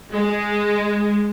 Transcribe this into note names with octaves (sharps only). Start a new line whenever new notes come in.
G#3